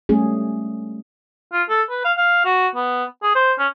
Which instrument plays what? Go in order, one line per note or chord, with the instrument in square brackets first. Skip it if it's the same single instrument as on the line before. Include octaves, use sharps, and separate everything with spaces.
[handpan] G3 A3 C#4 G#4
[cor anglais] F4
A4
B4
F5
F5
F#4
B3
G#4
C5
C#4